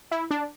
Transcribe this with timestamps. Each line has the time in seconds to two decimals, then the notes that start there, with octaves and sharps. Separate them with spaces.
0.11 E4
0.31 D4